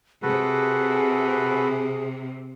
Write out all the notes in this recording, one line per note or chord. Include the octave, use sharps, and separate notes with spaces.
C3 F#4 G#4 A4 B4